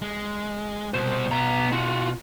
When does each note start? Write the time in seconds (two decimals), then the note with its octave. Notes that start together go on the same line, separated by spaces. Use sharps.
0.02 G#3
0.94 C2 B2 C5
1.31 B3 A#5
1.72 F4 F#4